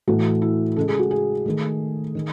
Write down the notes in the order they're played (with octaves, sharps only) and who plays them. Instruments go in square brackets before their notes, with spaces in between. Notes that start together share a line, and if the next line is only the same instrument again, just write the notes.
[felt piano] A2 E3 A3 F#4
E4
C#3 G#3 A4
G#4
F#4
G#4
D#3 A3
D#3